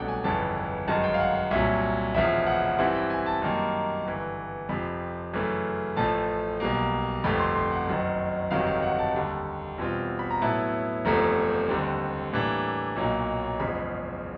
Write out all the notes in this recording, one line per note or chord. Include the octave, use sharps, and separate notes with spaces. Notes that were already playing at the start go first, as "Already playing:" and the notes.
Already playing: C2 B2 F#3 A3 D4 F#5 G5
G#5
G1 F2 C#3 E3 A5
G1 F#2 D#3 G#3 A5
G5
F5
F#5
F5
C2 A#2 F#3 E5
E1 E2 C#3 F3 E5
F#5
G2 E3 G3 C4 E4 F#5
G5
G#5
A5
F#2 D#3 G3 A#3
G1 G2 E3
F2 C3 F3 B5
F#2 C#3 E3 A3
A1 A2 F3 A3 A5
B1 B2 G3 A#3
G1 F2 C3 F3 A3 B5
C6
C6
F#5
F#1 F#2 D#3
G1 F2 C3 D#3 F#3 F5
F5
F#5
A5
D#2 D3 G3
E2 B2 G3 C4 F4
B5
A#5
A2 F#3 B3 E4 A5
F#1 E2 C3 F3 A3 A#5
D#2 D3 G3 C4
A2 E3 G3 A#3 D4
B1 A#2 F#3 A#3 D#4
F#1 E2 C#3 F3 G#3 B5